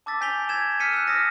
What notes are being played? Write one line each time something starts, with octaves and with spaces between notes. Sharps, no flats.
A5 D6 E6 A6 B6
G#5 G6 B6 D7 F7 G7
E6 G#6 E7
E6 F6 B6 C#7 D#7
E6 F#6
D#6 F6 A6 A#6 C#7